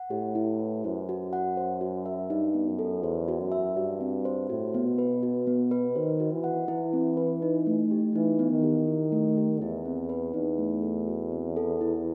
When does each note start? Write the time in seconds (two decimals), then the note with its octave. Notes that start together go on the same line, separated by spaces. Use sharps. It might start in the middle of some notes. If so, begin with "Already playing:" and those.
Already playing: F#5
0.10 A2 G4
0.35 E4
0.60 B4
0.84 F#2 C5
1.09 F#4
1.33 F#5
1.57 C5
1.81 F#4
2.06 E5
2.30 G2 D#4
2.54 B3
2.67 F#2
2.79 A4
3.03 E2 C5
3.28 F#4
3.40 F#2
3.52 E5
3.76 G2 F#4
4.01 C4
4.25 C5
4.49 A2 F#4
4.74 B3
4.86 B2
4.98 B4
5.23 F#4
5.47 B3
5.71 B4
5.96 D#3 C5
6.20 F#4
6.33 E3
6.44 F#5
6.68 E3 E4
6.93 C4
7.17 B4
7.42 D#4
7.67 A3
7.91 G4
8.15 E3 D#4
8.39 B3
8.51 D#3
8.64 G4
8.87 E4
9.12 A3
9.37 G4
9.61 E2 E4
9.85 C4
10.09 B4
10.34 E2 D#4
10.58 A3
10.83 A4
11.07 F#4
11.31 C4
11.56 A4
11.81 E4